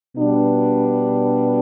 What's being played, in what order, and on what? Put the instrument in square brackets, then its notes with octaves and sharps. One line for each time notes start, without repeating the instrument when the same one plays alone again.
[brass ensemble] B2 G3 B3 D4